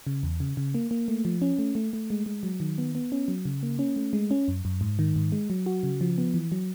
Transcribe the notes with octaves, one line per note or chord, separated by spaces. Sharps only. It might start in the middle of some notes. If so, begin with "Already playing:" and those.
C#3
E2
C#3
C#3
A#3
A#3
A3
F3
C#4
A3
A3
A3
G#3
G#3
F#3
D#3
B3
B3
C#4
F#3
C#3
A#3
C#4
A3
G#3
C#4
F#2
F#2
G#2
D#3
G#2
G#3
F#3
F#4
C#3
F3
B3
E3
F#3